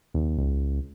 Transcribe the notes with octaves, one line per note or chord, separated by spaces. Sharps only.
D#2
C#2